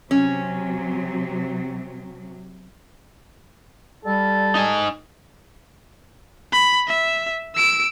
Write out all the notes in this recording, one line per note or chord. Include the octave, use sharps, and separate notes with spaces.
C3 F#3 C#4
G3 A4
D#4 G#5
B5
E5
E6 D7